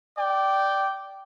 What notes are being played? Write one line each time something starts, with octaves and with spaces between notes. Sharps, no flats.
D5 G5